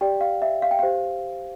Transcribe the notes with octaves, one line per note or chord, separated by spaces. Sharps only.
G4 D5 G5
F5
E5
F5
G5
G4 C5 F5